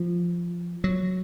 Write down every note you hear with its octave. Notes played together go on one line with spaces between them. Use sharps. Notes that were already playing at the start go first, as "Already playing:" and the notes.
Already playing: F3
F#3